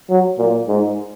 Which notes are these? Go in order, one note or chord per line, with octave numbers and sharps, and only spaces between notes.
F#3
A#2
G#2